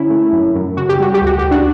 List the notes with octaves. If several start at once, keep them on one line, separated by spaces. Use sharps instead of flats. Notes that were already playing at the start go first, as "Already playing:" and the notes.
Already playing: D3 C#4 E4
A3
F#2
F#2
C#3 F#4
G4
G3 F#4
G4
D2 F#4
G4
D2
D4 F#4